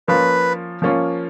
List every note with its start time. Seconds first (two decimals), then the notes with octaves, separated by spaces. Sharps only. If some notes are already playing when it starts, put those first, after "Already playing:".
0.08 F3 A#3 C#4 F4 B4
0.82 F3 A#3 C#4 F4